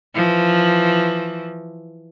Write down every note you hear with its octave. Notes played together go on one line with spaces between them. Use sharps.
E3 F3